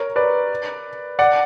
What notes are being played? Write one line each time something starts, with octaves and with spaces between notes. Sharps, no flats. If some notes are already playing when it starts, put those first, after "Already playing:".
Already playing: A#4 C#5
B4 D5
D5 F#5